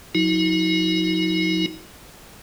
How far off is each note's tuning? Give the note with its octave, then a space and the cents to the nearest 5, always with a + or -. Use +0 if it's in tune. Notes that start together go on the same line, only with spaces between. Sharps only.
F#3 -40 D#4 +45 F#4 -15